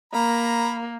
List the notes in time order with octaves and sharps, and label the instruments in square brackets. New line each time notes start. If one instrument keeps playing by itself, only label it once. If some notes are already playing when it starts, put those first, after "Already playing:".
[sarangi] A#3 [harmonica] A#5 B5